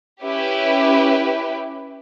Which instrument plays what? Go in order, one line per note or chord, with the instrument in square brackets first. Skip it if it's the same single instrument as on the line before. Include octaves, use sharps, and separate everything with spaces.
[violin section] C#4 E4 G4 B4